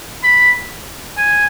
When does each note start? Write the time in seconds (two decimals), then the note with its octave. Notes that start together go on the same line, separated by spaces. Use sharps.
0.24 B5
1.17 G#5